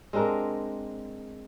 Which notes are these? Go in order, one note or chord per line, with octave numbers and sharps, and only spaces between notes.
G#3 C4 D4 A#4